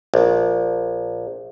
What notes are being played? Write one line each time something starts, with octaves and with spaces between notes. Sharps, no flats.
A#1